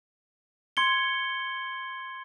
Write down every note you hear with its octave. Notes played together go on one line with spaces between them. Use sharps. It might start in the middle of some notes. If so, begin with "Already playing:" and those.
C6 G#6 C#7 G7